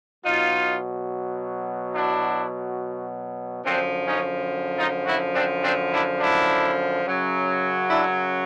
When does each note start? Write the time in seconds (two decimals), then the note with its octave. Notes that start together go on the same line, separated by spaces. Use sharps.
0.24 B2 F#3 D#4 F4
1.94 D4 E4
3.64 F#2 D3 F3 C4 D4
4.06 C#4 D#4
4.77 D#4 F4
5.06 E4 F#4
5.34 C4 D4
5.63 C4 D4
5.91 D4 E4
6.19 D4 E4
7.04 F#2 C#3 F#3
7.89 D4 E4